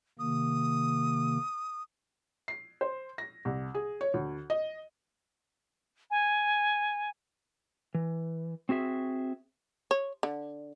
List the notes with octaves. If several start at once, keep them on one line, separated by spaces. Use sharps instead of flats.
C3 D#3 A#3 D#6
C7
C5
A#6
C2
G#4
C#5
D2
D#5
G#5
E3
C4 F#4 G#4 E5
C#5
D3